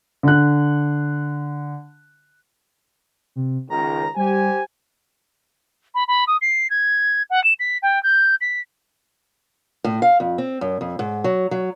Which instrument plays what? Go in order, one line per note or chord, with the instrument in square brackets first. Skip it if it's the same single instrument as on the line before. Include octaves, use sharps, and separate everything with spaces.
[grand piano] D3 F#6
[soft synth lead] C3
[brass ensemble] C#2 D#3 [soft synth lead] A#5
[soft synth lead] G3 [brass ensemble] G4 C5 G#5
[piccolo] B5
B5
D#6
C7
G#6
F#5
E7
B6
G5
G6
B6
[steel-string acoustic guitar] A2
F5
F2
C4
F#2
F2
G#2
F#3
F#3